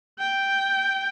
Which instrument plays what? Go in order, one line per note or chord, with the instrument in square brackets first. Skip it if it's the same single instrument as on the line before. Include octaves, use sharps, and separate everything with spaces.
[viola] G5